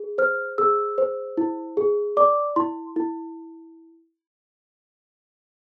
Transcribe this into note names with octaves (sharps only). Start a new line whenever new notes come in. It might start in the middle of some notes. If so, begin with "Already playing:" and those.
Already playing: G#4
C5 F6
G#4 E6
C5
E4
G#4
D5 D6
E4 C6
E4